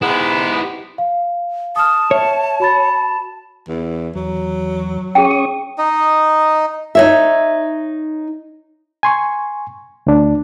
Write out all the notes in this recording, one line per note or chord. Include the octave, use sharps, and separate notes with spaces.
G#2 B3 E4 G4
F5
A5 D#6 F6
C#5 E5
F#4 B5 A6
E2
E2 F#3
C#4 G#4 G5 C#6 D#6
D#4 D#5
D#4 C#5 E5
G#5 C6 C#6
D2 D4